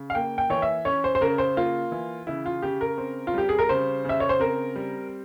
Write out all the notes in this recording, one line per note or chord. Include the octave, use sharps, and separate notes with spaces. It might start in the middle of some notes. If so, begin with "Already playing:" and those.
Already playing: C#3
F5
A#3 G5
G5
E3 C#5
E5
C#4 C#5
C5
C5
C#3 A#4
C5
A#3 F4
E3
C#3 E4
F4
C#3 G4
A#4
C4
F4
G3 G4
G#4
A#4
C#3 C5
C#3 E5
C#5
C5
C4 A#4
G3